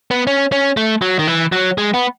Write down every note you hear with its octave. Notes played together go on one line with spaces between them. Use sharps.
B3
C#4
C#4
A3
F#3
D#3
E3
F#3
G#3
B3